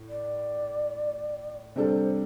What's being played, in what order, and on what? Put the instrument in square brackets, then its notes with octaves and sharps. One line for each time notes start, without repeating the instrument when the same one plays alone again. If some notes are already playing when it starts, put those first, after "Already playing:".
Already playing: [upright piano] A2
[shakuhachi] D5
[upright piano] C3 G3 D4 A4 [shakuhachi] C5